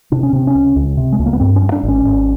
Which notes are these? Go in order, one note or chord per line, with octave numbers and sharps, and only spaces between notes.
C3 D4
C#4
C3 C4
C#4
C#2
C#2
C3
G#3
C#2 A3
A#3
B3
G2 C4
C#4
G2
D4
G#1
C#4
G#1